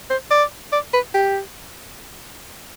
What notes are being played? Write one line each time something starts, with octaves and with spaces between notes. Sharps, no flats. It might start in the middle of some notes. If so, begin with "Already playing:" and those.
C5
D5
D5
B4
G4